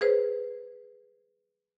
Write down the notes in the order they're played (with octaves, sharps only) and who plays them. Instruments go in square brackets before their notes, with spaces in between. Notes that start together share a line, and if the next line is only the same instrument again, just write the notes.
[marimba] G#4 B4 C5